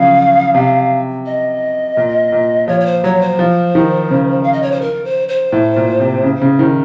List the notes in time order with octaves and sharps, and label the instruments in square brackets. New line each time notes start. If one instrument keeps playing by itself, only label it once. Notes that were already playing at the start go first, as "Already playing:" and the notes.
Already playing: [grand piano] C#3 F3 F#3 [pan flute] F5
[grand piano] C3
[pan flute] D#5
[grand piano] A#2
A#2
[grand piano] F3 [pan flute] C#5
[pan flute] C#5
C5
[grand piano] F#3 [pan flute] C#5
[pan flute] C5
[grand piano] F3
D#3
C#3
[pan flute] F5
D#5
C#5
C5
A#4
C5
C5
[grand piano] A2
A#2
C3
C#3
C#3
D#3